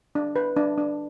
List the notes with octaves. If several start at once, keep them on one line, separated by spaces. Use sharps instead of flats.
D4
B4
D4
D4